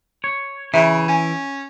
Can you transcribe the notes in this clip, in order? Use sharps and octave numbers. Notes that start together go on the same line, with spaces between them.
C#5
C#3 E3 E5
C#4 G#5 G#6